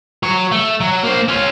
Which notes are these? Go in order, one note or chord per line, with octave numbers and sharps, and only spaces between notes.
F#3 C#5
A3
F#3
A#3 C5
C#4 F4